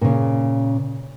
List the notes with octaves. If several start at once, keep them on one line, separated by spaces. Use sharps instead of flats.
A#2 C#3